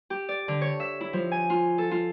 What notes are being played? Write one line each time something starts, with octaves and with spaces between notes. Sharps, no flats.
G4
D5
D3
C#5
E5
E4
F3
G#5
F4
A4
F4